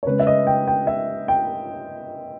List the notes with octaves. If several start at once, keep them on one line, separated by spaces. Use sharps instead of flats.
C#5
C#3 G#3 C#4 B4
E5
D#5
G5
G5
E5
G5